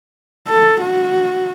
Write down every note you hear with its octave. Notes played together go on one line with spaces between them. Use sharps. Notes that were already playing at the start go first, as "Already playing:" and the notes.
A4
F#4